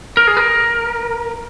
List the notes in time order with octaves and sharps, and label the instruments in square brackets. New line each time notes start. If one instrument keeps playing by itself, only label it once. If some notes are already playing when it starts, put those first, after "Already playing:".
[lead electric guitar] A#4
G#4
A#4